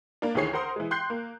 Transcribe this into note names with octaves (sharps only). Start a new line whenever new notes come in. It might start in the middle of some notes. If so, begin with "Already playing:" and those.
A#3 D4
D2 D#3 E3 G#4 C#5 C7
A#4 C5 F#5 A#5 C6 D#6
E3 G#3
G5 C6 F#6 G6 C7
A#3